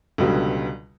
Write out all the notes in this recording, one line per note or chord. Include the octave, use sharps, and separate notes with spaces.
C#2 B2 D3 F#3 G3